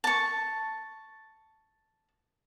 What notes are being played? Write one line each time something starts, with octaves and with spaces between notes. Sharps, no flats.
A5 C#6